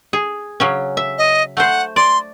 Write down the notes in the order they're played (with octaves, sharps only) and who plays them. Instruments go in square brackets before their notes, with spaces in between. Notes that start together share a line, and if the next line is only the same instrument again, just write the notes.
[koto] G#4
C#3 F#3 C#4
E5
[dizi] D#5
[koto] A3 C5 [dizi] F#5
[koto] D5 [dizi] C6